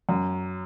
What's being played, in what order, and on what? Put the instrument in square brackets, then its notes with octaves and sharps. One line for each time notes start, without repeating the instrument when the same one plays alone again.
[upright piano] F#2